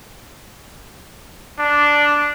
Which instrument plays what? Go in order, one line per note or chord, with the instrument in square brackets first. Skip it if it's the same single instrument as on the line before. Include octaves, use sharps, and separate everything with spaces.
[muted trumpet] D4